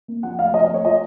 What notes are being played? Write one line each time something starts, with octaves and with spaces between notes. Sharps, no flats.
A#3
F3 F#5
A3 F5
F3 D#5
D#5
A3 C#5
F4 D#5